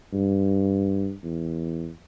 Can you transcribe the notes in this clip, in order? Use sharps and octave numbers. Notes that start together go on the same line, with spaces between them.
G2
E2